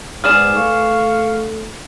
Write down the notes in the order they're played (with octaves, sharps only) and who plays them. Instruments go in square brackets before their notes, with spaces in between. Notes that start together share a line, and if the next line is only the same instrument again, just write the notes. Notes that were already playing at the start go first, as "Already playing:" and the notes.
[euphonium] G#2 [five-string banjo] B3 G#4 D5 [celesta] F6 E7
[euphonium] A3 [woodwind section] F5 C#6